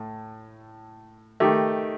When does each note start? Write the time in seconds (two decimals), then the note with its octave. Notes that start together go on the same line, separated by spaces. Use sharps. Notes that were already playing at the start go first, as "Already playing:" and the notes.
Already playing: A2 A3
1.40 D#3 A3 D#4 G4